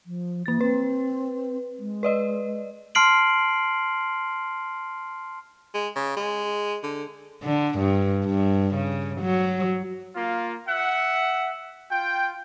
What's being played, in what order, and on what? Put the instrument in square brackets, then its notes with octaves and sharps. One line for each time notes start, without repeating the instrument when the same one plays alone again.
[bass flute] F3
[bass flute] E3 [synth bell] A#3 A6
[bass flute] C4 [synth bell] B4
[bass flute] G#3
[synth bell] B4 D5 D#5
[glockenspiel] A5 C6 F6 C7 D7 F#7
[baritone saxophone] G#3
C#3
G#3
D3
[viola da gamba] D3
G2
G2
C#3
F#3
[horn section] A#3 F4
E5 F#5
F4 G5